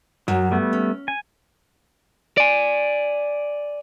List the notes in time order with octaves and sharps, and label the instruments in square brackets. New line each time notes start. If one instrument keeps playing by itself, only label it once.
[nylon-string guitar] F#2 [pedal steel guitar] F#3
[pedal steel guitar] G3 A3 B3
[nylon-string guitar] C#4
[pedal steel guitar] G#5
[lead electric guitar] D5 G#5